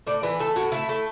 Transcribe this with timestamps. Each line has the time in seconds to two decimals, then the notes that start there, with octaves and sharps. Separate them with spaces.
0.07 A2 D5
0.23 E3 B4
0.39 A3 A4
0.56 A2 F#4
0.72 A3 E4
0.89 A3